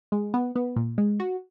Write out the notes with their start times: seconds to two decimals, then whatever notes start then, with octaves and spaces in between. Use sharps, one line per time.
0.12 G#3
0.34 B3
0.56 B3
0.76 A#2
0.98 G#3
1.20 F#4